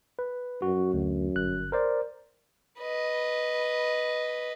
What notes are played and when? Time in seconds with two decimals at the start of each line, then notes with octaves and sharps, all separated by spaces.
0.19 B4
0.62 F#2 F#4
0.94 D2
1.35 G1 F#6
1.72 A#4 C5 D5
2.80 B4 D#5